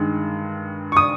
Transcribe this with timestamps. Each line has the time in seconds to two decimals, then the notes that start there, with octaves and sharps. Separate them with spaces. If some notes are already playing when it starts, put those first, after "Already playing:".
Already playing: G2 D#3 G#3
0.92 C#6
0.97 D#6